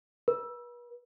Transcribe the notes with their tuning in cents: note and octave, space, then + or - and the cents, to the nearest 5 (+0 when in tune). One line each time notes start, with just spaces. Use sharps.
B4 -40